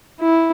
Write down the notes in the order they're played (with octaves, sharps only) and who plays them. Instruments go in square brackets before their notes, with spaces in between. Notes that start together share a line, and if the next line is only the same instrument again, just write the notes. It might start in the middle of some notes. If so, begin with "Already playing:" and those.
[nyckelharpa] E4